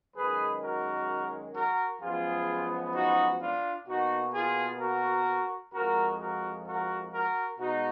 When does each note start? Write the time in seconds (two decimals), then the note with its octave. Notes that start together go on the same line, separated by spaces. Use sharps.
0.15 F#2 D#3 G#3 G#4 B4
0.62 F#4 A#4
1.54 F#4 A#4
2.01 F#2 F3 G#3 B3 F4 G#4
2.94 D#4 F#4
3.41 D4 F4
3.87 B2 A#3 D#4 F#4
4.34 F4 G#4
4.80 F#4 A#4
5.73 F2 F3 G#3 F#4 A#4
6.19 F#4 A#4
6.67 F#4 A#4
7.12 F#4 A#4
7.59 B2 G#3 D#4 F#4